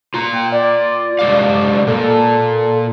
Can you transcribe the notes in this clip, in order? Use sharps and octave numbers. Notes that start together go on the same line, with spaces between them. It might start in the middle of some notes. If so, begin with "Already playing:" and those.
F4 A#5
G5
D5
G#3 G4 F5
A#2 A4